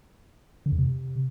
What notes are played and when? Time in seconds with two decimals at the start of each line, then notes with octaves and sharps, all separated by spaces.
0.66 D3
0.72 F2
0.79 C3